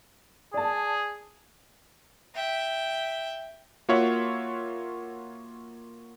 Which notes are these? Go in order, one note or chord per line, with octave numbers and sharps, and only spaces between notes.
G#4 D5 A5
E5 G5
A#3 F4 F#4 C#5 E5 F#5